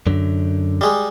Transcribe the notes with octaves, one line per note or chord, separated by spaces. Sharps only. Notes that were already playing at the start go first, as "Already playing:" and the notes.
F#2 D3
G3 G#3